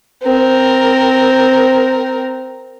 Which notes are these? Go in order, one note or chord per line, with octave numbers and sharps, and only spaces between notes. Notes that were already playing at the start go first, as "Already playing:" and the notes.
C4 A#4